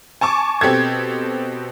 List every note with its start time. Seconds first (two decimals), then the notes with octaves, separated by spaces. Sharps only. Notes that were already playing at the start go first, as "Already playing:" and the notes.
0.21 G#5 A5 C#6 D6
0.61 B2 C4 G4 A4 G#6